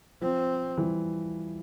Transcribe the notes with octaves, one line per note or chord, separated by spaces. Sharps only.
F3 C4
E3 G3